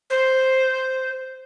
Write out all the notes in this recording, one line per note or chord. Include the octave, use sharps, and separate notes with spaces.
C5